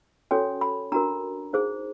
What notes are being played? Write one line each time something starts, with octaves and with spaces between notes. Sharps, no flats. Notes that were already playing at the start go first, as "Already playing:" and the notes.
C#4 F#4 A4 C#5 G#5
B5
D4 F#4 A#4 A#5
D#4 G#4 C5